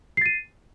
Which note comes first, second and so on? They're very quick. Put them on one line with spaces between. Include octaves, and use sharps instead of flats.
C7 A6 D#7